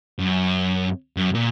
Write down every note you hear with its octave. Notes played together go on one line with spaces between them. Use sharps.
F#2
F#2
A#2